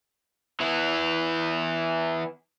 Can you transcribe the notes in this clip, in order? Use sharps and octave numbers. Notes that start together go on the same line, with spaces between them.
E3 B3